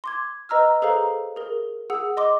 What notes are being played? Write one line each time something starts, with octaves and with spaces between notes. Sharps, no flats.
C6 D6 G#6
B4 D#5 A#5 E6 F6
G#4 A4 B4 C5 F5 A#5
G#4 A#4
G#4 F#5 E6
D#5 C6 D6